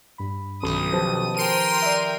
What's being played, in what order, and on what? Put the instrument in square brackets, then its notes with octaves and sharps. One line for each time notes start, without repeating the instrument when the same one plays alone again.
[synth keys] G2 B5
[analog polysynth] B1 [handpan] D#3 C#4 [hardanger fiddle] D#6
[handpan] F3 G4 B4 [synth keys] C5 A5
[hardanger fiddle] A#4 G5 [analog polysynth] C6 D#7
[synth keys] D5 E5